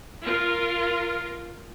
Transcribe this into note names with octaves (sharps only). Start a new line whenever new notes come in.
F4 A#4